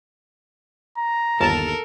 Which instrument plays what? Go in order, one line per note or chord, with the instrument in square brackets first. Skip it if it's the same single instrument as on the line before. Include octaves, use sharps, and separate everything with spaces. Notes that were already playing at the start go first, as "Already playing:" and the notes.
[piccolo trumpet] A#5
[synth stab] G1 D#2 A5 [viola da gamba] A4 A#4